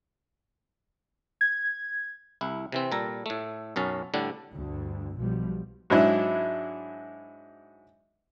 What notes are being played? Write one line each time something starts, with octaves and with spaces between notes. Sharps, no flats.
G#6
C2 E4
C3 E3 C4
A#2 G3 A4 A#5
A2 A3
B1 F#2 C#4 A5
A2 D3 G3 D4
D2 G2 D3
B1 B2 F3 G3
G#2 F#3 D4 E4